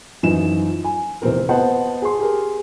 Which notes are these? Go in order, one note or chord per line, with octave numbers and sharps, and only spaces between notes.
F#2 E3 F3 D#4 E7
G#5
F1 E2 C4 A#4
B3 C5 D#5 F#5 A5
G#4 C6
G4 G#4 A#4